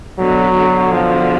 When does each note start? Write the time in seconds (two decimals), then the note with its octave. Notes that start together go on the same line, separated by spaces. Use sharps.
0.19 B2 D3 F#3
0.55 B2 D3
0.92 F3